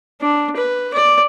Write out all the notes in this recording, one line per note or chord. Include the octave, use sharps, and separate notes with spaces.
D4
B4
D5